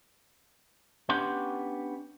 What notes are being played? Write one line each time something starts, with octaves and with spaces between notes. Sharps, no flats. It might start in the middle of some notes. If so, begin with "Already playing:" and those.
B3 C#4 D4 G4 C6